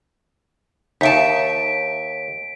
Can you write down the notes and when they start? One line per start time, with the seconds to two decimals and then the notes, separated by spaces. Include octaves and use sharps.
1.01 D#2 D#4 E5 A5 B6 D7